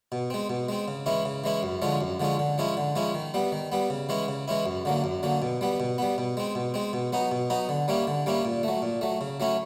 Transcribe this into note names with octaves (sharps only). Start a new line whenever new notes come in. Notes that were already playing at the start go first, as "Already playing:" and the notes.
B2
G#3 C4
B2
G#3 C4
C#3
E3 G#3 C#4 E4
C#3
E3 G#3 C#4 E4
F#2
D3 F3 G#3 C#4
F#2
D3 F3 G#3 C#4
D3
F3 G#3 C#4 E4
D3
F3 G#3 C#4 E4
D#3
G3 B3
D#3
G3 B3
C#3
E3 G#3 C#4 E4
C#3
E3 G#3 C#4 E4
F#2
D3 F#3 A#3
F#2
D3 F#3 A#3
B2
G3 B3
B2
G3 B3
B2
G#3 C4
B2
G#3 C4
B2
F#3 B3 D#4
B2
F#3 B3 D#4
D3
G3 A#3 C#4 E4
D3
G3 A#3 C#4 E4
A#2
F#3 A3
A#2
F#3 A3
C#3
F#3 A3 C#4 E4